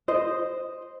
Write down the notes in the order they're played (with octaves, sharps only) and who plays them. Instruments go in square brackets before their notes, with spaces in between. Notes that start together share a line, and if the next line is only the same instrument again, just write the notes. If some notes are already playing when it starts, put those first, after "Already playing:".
[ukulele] C5 D#5